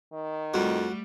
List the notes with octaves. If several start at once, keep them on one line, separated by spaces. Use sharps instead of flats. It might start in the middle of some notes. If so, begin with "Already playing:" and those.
D#3
F2 G3 A3 F#4